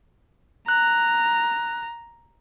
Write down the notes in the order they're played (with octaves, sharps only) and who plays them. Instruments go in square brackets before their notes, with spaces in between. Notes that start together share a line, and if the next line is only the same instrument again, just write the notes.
[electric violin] A#5 [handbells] F#6